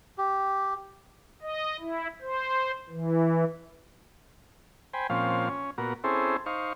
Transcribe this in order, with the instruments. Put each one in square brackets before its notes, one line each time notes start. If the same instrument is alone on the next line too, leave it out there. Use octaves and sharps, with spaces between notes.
[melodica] G4
[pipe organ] D#5
E4
C5
E3
[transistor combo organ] C5 G5 G#5 B5
A#2 F3 C4 C#4 F5
C#4
A#2 B3 F#4 A#4
C4 C#4 E4 G#4 A4 C5
D#4 C5 F5 C#6